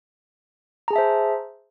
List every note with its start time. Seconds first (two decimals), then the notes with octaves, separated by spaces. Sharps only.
0.88 A#5
0.91 G#4
0.93 A5
0.96 E5
0.98 C5